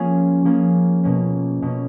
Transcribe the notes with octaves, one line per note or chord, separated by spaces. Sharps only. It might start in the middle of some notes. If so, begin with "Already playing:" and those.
Already playing: F3 A#3 C#4 F4 G#4
F3 A#3 C#4 F4 G#4
B2 A#3 C#4
B2 A#3 C#4